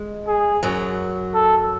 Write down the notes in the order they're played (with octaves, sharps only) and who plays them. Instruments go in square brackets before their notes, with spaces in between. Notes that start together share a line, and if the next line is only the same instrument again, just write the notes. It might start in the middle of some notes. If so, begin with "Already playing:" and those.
Already playing: [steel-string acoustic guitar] G#3
[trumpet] G#4
[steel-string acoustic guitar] F#2 F#3
[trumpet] A4